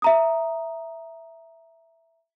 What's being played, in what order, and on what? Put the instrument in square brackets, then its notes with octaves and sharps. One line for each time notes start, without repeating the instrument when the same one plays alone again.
[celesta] E5 A#5 D#6